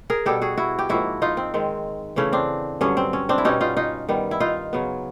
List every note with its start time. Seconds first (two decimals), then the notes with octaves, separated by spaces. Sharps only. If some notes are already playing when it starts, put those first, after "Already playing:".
0.10 G#4 A#4
0.26 B2 G3 B3 G4 A4
0.42 F#4 G#4
0.57 E4 F#4
0.79 G4
0.89 G#2 F3 A#3 E4 F#4
1.22 D#4 F4
1.37 C4
1.54 D#3 G#3 C4
2.16 C#3 E3 A3 C#4
2.32 C4 D4
2.81 G2 D3 F#3 C#4
2.97 C4
3.13 C#4
3.29 C4 D4
3.38 E4
3.45 B2 G3 B3 C#4 D#4
3.61 D#4 F4
3.77 D#4 F4
4.09 D#3 G3 B3
4.31 E4
4.40 D#4 F4
4.73 C#3 F#3 B3